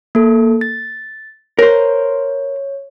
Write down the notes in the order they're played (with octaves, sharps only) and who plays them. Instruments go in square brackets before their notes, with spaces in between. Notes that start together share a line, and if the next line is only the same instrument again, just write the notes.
[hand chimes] A#3 A4
A6
[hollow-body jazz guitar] A#4 C5 [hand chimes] C#5